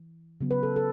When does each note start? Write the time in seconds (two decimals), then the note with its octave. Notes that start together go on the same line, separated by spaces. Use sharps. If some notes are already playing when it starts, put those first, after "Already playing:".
Already playing: E3
0.41 C#3 F#3 B3
0.51 B4
0.63 A4
0.76 A4